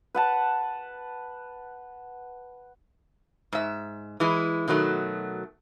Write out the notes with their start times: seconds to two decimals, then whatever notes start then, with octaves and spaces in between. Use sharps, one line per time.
0.15 B4 F#5 A5
3.53 G#2 E5
4.20 E3 G#3 E4
4.68 B2 D#3 F#3 A3